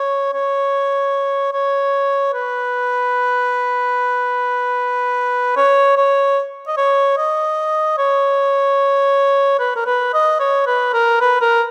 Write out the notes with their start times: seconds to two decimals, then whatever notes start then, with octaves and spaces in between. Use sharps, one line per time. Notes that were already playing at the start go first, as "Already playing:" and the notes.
Already playing: C#5
0.33 C#5
1.53 C#5
2.34 B4
5.56 C#5
5.97 C#5
6.67 D#5
6.77 C#5
7.17 D#5
7.98 C#5
9.60 B4
9.76 A#4
9.86 B4
10.14 D#5
10.40 C#5
10.67 B4
10.94 A#4
11.21 B4
11.41 A#4